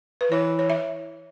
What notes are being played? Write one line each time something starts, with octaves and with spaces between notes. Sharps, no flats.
B4
E3 C#5
C#5
E5